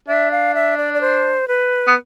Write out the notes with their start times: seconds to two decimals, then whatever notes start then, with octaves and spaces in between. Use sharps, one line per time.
0.08 D4 E5
0.31 F5
0.55 E5
0.77 D5
0.94 D5
1.01 C5
1.48 B4
1.87 B3